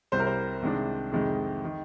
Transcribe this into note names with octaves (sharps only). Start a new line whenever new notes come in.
C2 C3 G3 C5
A#4
C5
C2 C3 D#3 G#3 D4
F2 C3 D#3 G#3
D#3